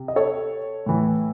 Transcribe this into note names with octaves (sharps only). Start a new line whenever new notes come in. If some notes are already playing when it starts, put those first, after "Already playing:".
Already playing: C3
D#5
A4 C#5
A2 E3